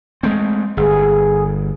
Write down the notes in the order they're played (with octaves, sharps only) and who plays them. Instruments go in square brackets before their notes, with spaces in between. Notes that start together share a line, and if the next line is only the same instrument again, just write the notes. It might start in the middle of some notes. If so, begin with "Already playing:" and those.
[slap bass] G#3 A3 C4
[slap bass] G1 [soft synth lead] G#4